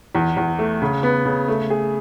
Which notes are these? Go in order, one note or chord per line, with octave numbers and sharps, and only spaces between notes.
E2
E2
A3
C#3
B3
C#3
A3
G#4